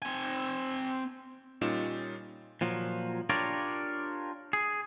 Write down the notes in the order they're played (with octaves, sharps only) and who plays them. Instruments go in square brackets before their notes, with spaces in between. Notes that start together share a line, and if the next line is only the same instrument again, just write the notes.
[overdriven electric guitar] C4 G#5
[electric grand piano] A#2 G3 C#4 D#4 F4 E7
[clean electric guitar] A#2 F3 F#3
D4 F4 G4 A#4 C#5 D5
G#4